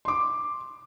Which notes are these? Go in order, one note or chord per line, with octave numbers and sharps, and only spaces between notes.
C6 D6